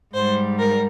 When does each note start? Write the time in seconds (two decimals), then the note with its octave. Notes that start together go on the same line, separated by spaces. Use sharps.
0.13 G#2 G3 C5
0.59 A#4